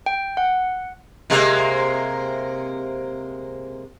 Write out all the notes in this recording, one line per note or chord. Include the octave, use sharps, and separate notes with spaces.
G5
F#5
C3 G#3 A#3